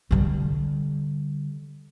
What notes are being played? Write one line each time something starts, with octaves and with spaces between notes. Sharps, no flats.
D3 G3